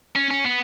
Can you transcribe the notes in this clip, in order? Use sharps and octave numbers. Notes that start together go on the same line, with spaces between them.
C#4
C#4
B3